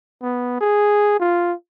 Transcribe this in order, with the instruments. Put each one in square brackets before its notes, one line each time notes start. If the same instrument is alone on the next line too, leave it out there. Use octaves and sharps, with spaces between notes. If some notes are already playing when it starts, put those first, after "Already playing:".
[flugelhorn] B3
G#4
F4